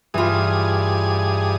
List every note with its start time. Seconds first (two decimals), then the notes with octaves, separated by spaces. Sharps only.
0.14 G2 E3 F4 G#4 D#6